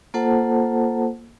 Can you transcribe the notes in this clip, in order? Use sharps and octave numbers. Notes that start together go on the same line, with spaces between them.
A#3 F4 A4 C5 F#5 A5